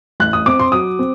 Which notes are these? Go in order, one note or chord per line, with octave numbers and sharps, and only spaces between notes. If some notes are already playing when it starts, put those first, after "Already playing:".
A1 F#6
D#6
C4 D6
C6
F#3 D#6
C4